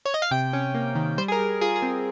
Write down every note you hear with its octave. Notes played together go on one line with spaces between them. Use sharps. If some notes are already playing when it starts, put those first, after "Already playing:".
C#5
D#5
F5
C3 G5
C#4
A#3
D#3
G3 C5
G#4
A#4
G3
F4 G#4
G#4
C4